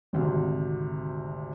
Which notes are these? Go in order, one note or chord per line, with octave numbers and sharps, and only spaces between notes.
G#1 D2 C3